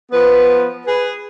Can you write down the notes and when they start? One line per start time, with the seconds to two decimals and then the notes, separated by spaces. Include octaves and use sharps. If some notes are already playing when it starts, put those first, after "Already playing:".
0.12 F3 B3 B4
0.86 G#4 B4